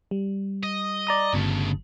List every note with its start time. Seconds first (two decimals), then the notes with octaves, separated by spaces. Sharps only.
0.11 G3
0.63 D#5
1.07 D5 A#5 D#6
1.33 G1 C#3 A3